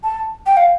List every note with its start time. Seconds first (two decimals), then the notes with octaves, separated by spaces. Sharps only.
0.03 A5
0.47 G5
0.57 F5